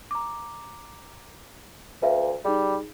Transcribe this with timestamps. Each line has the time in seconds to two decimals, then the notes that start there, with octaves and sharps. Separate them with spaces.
0.11 A#5 D6
2.02 D2 B4 E5 F5
2.45 G3 D#4 G#4